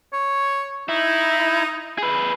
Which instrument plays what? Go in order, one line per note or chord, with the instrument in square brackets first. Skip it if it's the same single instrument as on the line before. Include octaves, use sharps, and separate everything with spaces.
[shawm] C#5
[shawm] D#4 [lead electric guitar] E4
[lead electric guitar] G#4 B4